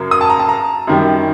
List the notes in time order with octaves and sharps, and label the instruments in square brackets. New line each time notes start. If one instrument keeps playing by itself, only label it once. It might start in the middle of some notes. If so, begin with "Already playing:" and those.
Already playing: [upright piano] F#2 C#3 F#3 A#3
D#6
A5
A#5
A5
A#5
F#2 D#3 G3